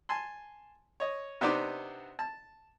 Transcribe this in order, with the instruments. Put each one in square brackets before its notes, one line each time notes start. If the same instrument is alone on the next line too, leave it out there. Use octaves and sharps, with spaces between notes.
[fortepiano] G#5 A5 C6
C#5 D#5
C3 B3 D4 D#4 C5 D6
A5